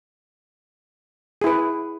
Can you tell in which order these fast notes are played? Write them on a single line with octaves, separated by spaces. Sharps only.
G#4 E4 B4